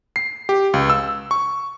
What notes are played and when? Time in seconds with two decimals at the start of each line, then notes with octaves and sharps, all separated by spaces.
0.16 C7
0.49 G4
0.74 C#2
0.90 E6
1.31 C#6